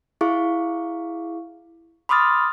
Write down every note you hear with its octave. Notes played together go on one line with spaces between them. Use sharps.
E4 G#4 F5 C#6
B5 C6 D6 D#6 F6 A6